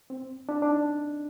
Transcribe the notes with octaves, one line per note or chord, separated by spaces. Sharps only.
C4
D4
D4
D#4